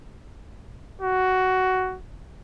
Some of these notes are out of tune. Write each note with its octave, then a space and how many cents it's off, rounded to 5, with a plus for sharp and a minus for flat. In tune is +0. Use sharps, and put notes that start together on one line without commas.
F#4 +10